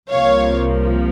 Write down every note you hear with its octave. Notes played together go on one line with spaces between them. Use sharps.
C2 C3 F3 A#3 C#5 F5